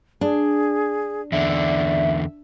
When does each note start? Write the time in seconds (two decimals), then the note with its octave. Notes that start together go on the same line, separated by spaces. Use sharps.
0.21 D4 G#4
1.32 E2 D3 D5 E5